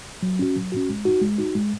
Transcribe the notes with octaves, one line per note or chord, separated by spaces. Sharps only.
F#3
C#4 F#4
F#3
C#4 F#4
G#3
D#4 F#4
G#3
D#4 F#4
G#3